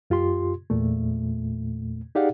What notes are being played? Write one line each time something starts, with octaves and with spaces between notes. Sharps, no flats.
F#2 F4 G4 C6
E2 A#2 A3
D#4 G4 G#4 D5 F5 F#5